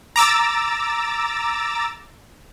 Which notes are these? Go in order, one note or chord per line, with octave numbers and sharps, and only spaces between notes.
A#5 D6 E6 A6